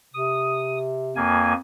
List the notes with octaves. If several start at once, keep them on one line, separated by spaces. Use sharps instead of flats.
C3 D#6
F2 A#3 G#5